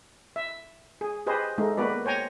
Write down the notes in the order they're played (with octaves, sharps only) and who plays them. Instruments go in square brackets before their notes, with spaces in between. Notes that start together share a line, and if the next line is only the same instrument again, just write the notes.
[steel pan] E5
G#4
G4 G#4 B4 C5 D#5
G#3 A3 D#4
A#3 B3 F#4 B4 D5
C5 C#5 G5 G#5 A#5